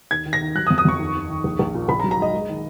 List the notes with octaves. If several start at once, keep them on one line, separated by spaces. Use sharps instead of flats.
D#2 G#6
D#3
A#6
D#3
F#3 F#6
D#6
F2
D#6
F2 C#6
D#2
D#2
D#3
A#1
A#1
A#2
A#1 B5
A#5
F#3
A#5
G#2 D#5
G#3
D#3